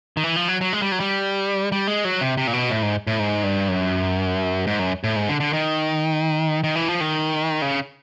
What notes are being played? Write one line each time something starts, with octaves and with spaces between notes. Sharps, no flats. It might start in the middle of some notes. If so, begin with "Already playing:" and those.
D#3
E3
F3
F#3
F#3
G#3
G3
F#3
G3
G3
G#3
F#3
C3
C3
A#2
B2
A2
G#2
A2
G#2
G2
F#2
G#2
F#2
A2
G#2
D3
D3
D#3
D#3
E3
F3
D#3
C#3